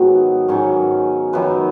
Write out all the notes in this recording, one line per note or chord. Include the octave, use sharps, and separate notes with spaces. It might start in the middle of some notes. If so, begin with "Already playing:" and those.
Already playing: G#2 D#3 F#3 B3
G#2 D#3 F#3 C#4
F#2 D#3 F#3 B4